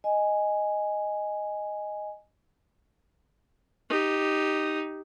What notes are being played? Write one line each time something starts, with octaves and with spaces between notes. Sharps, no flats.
D#5 G#5
D#4 G4